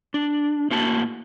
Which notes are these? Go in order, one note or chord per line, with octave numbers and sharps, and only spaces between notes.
D4
A2 A#3 F#4 A5